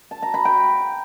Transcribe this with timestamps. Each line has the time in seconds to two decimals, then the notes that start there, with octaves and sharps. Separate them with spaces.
0.11 A5
0.22 A#5
0.34 B5
0.45 G5